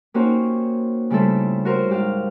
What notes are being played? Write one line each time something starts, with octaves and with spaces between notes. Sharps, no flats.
A#3 C#4 D#4 F#4 G4 C5
C#3 G3 A3 E4 A4 C5
F#4 A#4 C5
G#2 G4 F5